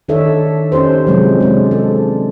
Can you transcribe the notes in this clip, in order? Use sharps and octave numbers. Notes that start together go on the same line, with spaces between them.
D#3 D4 D#4 A4 C#5 E5
C#4 D#4 G4 C5
C3 F3 F#3 G#3
G#3 D4
A4